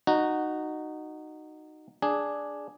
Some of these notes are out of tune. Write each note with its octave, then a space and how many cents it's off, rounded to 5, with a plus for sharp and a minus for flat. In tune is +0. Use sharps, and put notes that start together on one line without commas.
D#4 -15 F#4 +0
D4 +0 G#4 +0